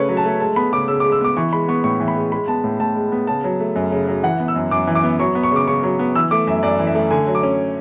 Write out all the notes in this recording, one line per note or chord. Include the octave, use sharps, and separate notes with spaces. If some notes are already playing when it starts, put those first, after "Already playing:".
Already playing: C#3 A3 C#4 B4 C#5
F#3
A5
A3
G#3 A5
B3 B5
C#3 D6
C#3 E6
D6
G#3
E6
B3 D6
E3 C#6
G#3 B5
B3 C#6
A2 C#6
E3
B5
G#3
G#3 B5
B3 A5
A2
A2 A5
G#3
B3
C#3 A5
F#3
A3
F#2
C#3
F#3
E3 F#5
B3
E6
F#2
F#2 D6
E3
D6
B3
F#3 C#6
B3
C#6
C#3 D6
C#3 C#6
F#3
B3
E3 E6
A3 D6
F#2 E5
F#2 D5
E3
E5
A3
D3 G#5
F#3
D6
C#4